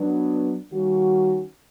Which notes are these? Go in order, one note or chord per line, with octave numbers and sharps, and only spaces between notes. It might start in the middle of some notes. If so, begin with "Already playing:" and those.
Already playing: F#3 B3 D4
D#3 G3 A#3 C#4 F#4